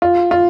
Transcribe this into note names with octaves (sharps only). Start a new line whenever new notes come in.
F4
F4